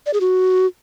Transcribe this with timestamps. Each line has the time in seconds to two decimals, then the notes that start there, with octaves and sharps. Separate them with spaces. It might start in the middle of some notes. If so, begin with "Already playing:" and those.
0.06 D5
0.14 G#4
0.21 F#4